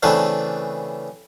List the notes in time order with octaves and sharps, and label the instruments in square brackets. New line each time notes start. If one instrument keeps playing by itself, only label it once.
[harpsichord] C#3 E3 A3 B3 C4 D4